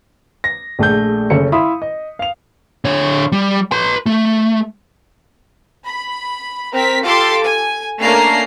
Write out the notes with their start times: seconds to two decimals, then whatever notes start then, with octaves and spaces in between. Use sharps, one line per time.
0.44 A#6
0.79 A#1 A3 G#4 G6
1.30 F#1 C#4 A4 C#7
1.52 E4 E5 F5 B5 C6 D#6
1.82 D#5
2.19 F5 F7
2.85 D3 C#5
3.32 G3
3.72 B4 C6
4.06 A3
5.85 B5
6.74 C4 A#4 B6
7.04 F4 G4 A4 C6 D6
7.44 G#5
8.00 A3 A#3 C#4 D4 A#5 C7